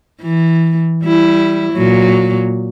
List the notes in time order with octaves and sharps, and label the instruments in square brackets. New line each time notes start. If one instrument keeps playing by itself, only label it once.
[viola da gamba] E3
G3 E4
A#2 F#3